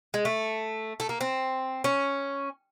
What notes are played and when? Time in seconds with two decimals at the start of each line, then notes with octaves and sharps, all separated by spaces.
0.14 G#3
0.25 A3
1.00 A3
1.09 A#3
1.21 C4
1.84 C#4